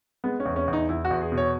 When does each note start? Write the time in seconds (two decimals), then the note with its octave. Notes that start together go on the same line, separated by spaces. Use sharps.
0.24 G#3 B3
0.40 C#4
0.45 E2
0.56 C#4
0.68 E2
0.73 D#4
0.89 E2 E4
1.05 F#4
1.11 E2
1.22 G#4
1.32 B2
1.37 C#5